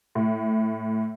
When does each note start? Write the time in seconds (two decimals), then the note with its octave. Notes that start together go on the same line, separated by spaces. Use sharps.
0.15 A2